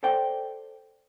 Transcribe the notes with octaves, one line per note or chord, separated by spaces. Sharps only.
A4 C5 D5 G5